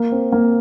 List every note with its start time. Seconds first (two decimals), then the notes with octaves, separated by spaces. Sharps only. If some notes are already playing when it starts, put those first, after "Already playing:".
Already playing: A#3
0.12 C4
0.32 A#3